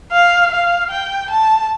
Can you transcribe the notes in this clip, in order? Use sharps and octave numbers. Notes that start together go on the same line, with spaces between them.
F5
F5
G5
A5